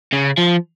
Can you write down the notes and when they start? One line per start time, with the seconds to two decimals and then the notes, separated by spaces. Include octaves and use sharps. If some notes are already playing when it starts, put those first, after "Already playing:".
0.13 C#3
0.37 F3